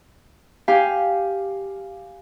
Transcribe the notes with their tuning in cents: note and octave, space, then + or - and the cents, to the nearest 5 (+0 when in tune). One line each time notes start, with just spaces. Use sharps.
G4 +0 F5 +0 G#5 +0